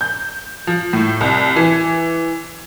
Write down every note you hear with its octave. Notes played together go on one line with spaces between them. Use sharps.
G6
F3
A2
C2
E3